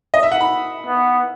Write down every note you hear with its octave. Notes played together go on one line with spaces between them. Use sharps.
D#5
E5
F#5
B5
B3